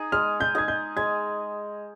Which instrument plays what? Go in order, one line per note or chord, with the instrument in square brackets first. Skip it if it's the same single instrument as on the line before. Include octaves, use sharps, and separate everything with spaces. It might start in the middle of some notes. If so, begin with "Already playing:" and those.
Already playing: [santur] D#4 G#4
[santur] G#3 [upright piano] F6
[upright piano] G6
[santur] D#4 G#4 [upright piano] G#6
[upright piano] G6
[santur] G#3 [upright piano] G#6